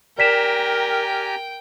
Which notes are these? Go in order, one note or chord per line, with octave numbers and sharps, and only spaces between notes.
G4 A#4 D5 G5 G#5 A#5 B6 E7